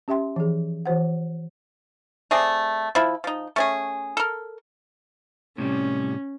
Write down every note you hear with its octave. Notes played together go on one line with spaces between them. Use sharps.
C#4 G4 E5 G5 C6
E3 F3 G#4
E3 F#4 C5 F#5
A3 C4 G#4 D5
F3 E4
F3 D#4
A3 C#4 G#4
A4 A#4
A2 C3 G3 C#4